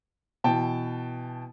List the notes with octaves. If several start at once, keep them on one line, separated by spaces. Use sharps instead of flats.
B2 E3 G5 A5